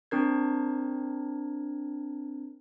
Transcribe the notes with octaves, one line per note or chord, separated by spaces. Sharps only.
C4 D4 A#4 G#6